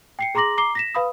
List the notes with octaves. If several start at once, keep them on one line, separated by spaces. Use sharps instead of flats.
G5 C7 C#7
G#4 A#5 C6 D6 A#6 F#7
A#5 D6 C7 G7
A#6 B6 E7
B4 F5 B5 D#6